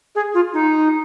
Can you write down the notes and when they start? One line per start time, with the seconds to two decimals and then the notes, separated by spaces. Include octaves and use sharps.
0.15 G#4
0.34 F4
0.54 D#4